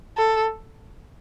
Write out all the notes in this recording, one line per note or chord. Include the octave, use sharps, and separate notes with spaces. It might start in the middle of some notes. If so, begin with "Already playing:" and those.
A4